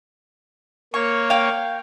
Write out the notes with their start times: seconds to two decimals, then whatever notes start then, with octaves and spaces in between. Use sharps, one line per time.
0.94 A#3 C#5 C#6
1.30 F5 G5